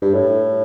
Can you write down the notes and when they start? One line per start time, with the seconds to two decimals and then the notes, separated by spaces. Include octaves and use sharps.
0.02 G2
0.14 A2